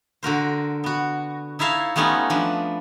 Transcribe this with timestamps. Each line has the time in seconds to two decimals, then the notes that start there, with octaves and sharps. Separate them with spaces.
0.23 D3 F#4 A#4 C5
0.84 B3 F#4
1.59 D#4 E4 C#5 E5 F5 A5
1.96 G3 A3 B3 C#4 D#4 F4
2.30 F3 D4 B4